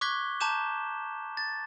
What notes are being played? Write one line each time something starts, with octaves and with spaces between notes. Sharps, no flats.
C#6 D6 F#6 G#6 B6 G7
A5 A#5 D6 G6 E7
A6